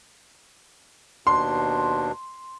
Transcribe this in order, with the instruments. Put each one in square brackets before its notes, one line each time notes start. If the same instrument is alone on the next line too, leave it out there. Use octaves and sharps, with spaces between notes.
[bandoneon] D#2 B2 D4 [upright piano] C6